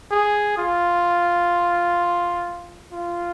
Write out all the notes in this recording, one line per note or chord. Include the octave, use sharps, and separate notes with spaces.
G#4
F4
F4